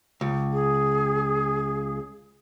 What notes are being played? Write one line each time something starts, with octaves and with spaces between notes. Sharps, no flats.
C#2
G#4